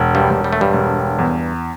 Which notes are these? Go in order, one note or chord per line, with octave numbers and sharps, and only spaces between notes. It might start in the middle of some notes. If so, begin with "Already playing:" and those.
Already playing: E1
G2 G3
E1
G3
A3
G2 G3
E1
E2